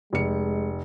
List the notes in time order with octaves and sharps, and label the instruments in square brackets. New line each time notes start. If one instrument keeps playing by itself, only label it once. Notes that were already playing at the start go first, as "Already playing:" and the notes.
[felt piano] F1 C#7 [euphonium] G#3